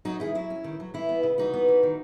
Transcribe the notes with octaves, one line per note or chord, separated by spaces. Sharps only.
F#3 D#4 F#4
D#3 E4 G#4
F#3 E4
C#4
D#3
F#3
E3 E4
B3
C#3
E3 D#4 F#4
B3
E3
D#3